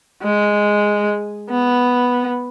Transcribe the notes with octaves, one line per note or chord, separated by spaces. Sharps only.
G#3
B3